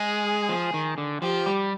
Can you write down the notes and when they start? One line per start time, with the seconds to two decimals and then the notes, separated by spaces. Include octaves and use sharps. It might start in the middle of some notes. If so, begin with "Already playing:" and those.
Already playing: G#3 G#4
0.49 F3
0.74 D#3
0.98 D3
1.22 F3 G4
1.46 G3